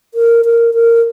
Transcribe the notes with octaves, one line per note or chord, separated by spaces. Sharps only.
A#4
A#4
A#4